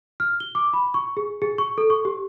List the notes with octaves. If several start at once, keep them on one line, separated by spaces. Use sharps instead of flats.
F6
G7
D6
B5
C#6
G#4
G#4
C#6
A4
C#6
G4